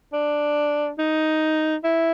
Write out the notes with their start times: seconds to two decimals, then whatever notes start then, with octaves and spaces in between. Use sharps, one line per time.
0.13 D4
0.99 D#4
1.84 E4